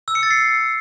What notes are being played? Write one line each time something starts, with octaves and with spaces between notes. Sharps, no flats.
E6
C#7
A6
C7